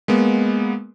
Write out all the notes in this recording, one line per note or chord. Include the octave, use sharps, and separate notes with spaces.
G#3 A#3 B3